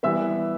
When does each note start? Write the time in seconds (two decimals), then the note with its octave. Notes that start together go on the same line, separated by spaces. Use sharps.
0.03 E3 G3 B3 E5 E6